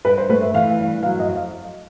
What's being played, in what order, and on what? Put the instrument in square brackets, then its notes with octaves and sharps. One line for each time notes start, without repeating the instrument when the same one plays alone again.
[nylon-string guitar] G2 [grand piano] B4
[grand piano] C5
[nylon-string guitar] A3 [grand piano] B4
[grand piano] E5
[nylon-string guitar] E3 [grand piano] F5
[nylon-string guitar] G2
[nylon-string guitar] F#3 [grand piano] F5
[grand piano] D#5
[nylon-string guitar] F2
[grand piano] F5